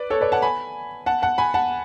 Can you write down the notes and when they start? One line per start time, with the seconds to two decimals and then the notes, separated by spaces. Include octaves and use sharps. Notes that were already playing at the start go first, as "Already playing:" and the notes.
Already playing: B4 D5
0.10 A4 C#5
0.21 B4 D5
0.32 F#5 A5
0.42 G#5 B5
1.06 F#5 A5
1.22 F#5 A5
1.38 G#5 B5
1.54 F#5 A5